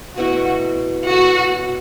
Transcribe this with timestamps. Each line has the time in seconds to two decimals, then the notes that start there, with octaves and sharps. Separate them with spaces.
0.17 B2 A3 E4 F#4
1.09 B3 F#4 A4 C#5